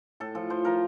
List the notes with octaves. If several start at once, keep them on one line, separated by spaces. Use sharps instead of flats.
A2 A4
F3 A4
F3 C5
F3 A#4